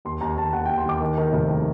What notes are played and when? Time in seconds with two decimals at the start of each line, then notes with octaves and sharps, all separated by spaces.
0.05 D#2 C6
0.21 D#2 A#5
0.37 D#2 A5
0.53 D#2 F#5
0.66 G5
0.70 D#2
0.78 C6
0.86 D#2 D6
1.01 D#3
1.18 D#3
1.33 F1
1.49 D#3